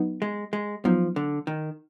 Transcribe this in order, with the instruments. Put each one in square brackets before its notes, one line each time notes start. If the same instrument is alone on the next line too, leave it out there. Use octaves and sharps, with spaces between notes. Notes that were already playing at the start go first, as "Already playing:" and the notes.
Already playing: [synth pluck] F#3 B3 D#4
[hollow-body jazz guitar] G#3
G#3
[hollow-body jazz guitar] F3 [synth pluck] F#3 B3 D#4
[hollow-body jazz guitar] D3
D#3